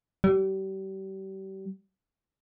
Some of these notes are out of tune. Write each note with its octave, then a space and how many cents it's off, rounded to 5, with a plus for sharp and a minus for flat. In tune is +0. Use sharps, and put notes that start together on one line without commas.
G3 -35